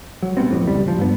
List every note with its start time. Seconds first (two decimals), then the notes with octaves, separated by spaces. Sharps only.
0.22 F#3
0.37 A#1 G3 B3 C4
0.50 F2 A2
0.66 C#2 G3
0.84 D1 F3
0.99 G2 B3